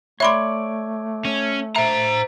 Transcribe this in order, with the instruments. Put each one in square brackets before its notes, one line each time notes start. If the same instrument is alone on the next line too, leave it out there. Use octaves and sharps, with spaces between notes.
[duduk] A3 [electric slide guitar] C#5 D5 [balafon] E5 B5 C6
[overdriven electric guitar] C#4
[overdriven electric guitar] C5 A#5 [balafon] E5